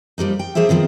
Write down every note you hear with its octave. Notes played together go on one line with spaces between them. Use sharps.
F3 G3 A#3 D#4
G5
F3 A#3 G#4 C5 E5
B2 D#3 F3 C4